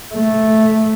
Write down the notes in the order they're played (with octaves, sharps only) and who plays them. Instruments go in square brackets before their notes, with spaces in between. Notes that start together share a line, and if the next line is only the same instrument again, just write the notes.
[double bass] A3